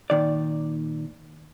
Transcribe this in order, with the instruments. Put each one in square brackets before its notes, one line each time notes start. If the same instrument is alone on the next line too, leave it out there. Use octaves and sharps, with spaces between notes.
[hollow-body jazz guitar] A#2 D#3 D5